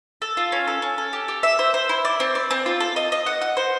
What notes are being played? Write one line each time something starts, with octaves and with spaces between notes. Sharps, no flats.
A4
F4
C#4
A4
C#4
A4
G4
G4
E5
C5
C5
E4
D5
C4
D5
C4
F4
A4
D#5
D#5
F#5
F#5
C5